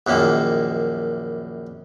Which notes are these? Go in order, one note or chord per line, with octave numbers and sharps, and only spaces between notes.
A#1 F#2 D#3 A#3